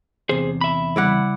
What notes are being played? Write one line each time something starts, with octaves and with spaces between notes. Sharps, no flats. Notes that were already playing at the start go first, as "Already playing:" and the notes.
E2 C3 G#4 C5
E5 B5
C#3 G3 E4 D5 F#5